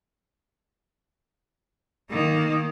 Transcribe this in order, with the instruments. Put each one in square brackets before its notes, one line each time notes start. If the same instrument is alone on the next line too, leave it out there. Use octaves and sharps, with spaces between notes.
[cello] D#3 A#3